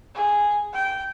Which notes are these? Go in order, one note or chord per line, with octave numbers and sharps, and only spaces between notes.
G#4
G5